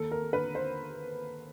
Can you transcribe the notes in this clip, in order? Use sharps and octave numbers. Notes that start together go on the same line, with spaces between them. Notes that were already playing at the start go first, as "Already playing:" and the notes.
Already playing: D#2 A4
A#4
D3 B4
C5